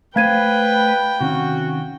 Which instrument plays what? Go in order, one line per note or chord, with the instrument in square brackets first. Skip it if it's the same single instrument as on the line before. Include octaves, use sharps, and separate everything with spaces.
[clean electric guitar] A3 C5 [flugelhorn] B4 [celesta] F5 G#6 D#7 [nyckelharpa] G5
[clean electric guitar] C3 D#3 C#4 [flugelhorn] F#4